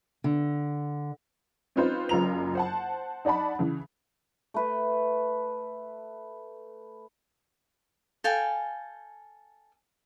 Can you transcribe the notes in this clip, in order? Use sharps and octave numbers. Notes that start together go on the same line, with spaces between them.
D3
C4 C#4 D#4 F4 B4 C5
F#1 F#2 F4 A#5 F7
C5 F#5 A5
D#4 D5 F#5 A5 B5
C#3 E3
A3 B4 B5
A4 F5 G5 G#5